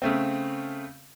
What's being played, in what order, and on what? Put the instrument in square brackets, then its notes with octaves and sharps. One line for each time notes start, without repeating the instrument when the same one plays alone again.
[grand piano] C#3 A3 C4